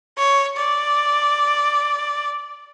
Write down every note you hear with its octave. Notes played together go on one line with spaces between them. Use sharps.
C#5
D5